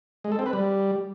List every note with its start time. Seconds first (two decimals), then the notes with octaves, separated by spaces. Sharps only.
0.25 G#3
0.32 A4
0.39 C4
0.46 B4
0.53 G3